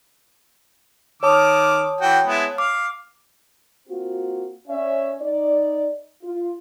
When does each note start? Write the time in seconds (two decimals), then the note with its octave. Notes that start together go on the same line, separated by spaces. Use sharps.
1.23 D#3 C#5 A5 D6 D#6 F6
2.01 E3 F#4 G5
2.26 G#3 B3 E4
2.58 F5 D6
3.88 A#3 C4 F4 F#4
4.68 C#4 D5 E5
5.21 D#4 D5
6.23 F4